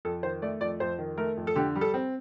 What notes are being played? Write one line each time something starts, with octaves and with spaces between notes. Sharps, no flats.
F2 A4
D#3 C5
A3 D5
F2 D5
F2 C5
D#3
A3 A#4
F2
A4
D3 G4
G3
A4
C4